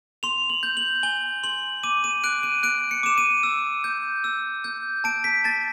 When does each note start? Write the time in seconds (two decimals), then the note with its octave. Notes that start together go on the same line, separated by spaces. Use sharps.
0.23 C6 F7
0.50 F#7
0.63 G6
0.77 F#7
1.03 G#5 G7
1.43 C6 F#7
1.83 D6 D#7
2.04 D#7
2.24 F#6 D7
2.43 D#7
2.63 F#6 D7
2.91 C#7
3.03 D6 E7
3.18 D#7
3.43 E6
3.84 G6
4.24 E6
4.64 G6
5.04 A5 D7
5.24 B6
5.44 A5 A6